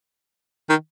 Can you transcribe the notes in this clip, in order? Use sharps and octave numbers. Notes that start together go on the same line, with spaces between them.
D#3